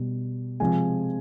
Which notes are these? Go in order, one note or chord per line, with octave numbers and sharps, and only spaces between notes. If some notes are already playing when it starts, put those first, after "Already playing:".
Already playing: B2 G3
C3 F3 G#3 G#5